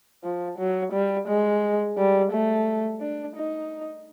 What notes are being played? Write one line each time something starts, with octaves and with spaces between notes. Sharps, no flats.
F3
F#3
G3
G#3
G3
A3
D4
D#4